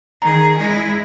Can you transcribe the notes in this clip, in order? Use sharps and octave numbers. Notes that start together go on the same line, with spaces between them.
D#3 G#4 A#5
G#3 E4